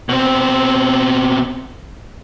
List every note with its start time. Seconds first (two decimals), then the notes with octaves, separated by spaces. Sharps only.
0.09 B2 C4